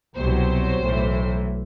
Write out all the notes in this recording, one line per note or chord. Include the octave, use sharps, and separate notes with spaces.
C2 B2 F#3 C5
B1 A2 E3